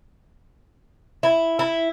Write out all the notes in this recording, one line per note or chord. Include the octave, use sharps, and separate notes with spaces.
E4
E4